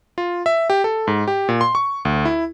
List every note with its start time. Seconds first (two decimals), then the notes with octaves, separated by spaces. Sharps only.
0.18 F4
0.46 E5
0.70 G4
0.84 A4
1.07 G#2
1.28 G4
1.49 A#2
1.61 C6
1.75 C#6
2.05 D2
2.25 E4